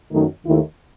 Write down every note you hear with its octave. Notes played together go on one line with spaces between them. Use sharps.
F#2 D#3 F#3 A3 D#4
D#2 D#3 A3 E4